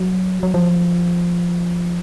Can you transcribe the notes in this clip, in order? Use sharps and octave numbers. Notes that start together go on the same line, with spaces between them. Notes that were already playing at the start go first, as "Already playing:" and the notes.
Already playing: F#3
F#3
F3